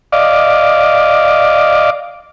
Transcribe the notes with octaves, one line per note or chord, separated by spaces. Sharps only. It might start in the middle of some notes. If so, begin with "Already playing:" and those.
D5 D#5 F5 D6